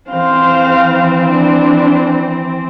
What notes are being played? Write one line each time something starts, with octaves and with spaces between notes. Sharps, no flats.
E3 C4 C5 F5
D4